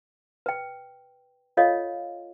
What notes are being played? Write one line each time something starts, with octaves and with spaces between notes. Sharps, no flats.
B4 G5
F4 A4 C#5 D#5 F5